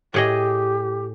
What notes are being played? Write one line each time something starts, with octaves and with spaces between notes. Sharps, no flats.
A2 G4 G#4 D#5